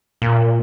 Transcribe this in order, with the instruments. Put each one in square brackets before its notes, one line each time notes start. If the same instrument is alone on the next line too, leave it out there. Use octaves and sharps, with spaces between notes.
[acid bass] A#2